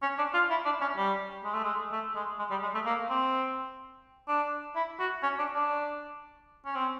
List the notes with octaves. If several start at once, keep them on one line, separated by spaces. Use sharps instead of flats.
C#4
D4
F4
E4
D4
C#4
G3
G#3
A3
G#3
A3
G#3
G#3
G3
G#3
A3
A#3
C4
D4
E4
F#4
C#4
D4
D4
C#4
C4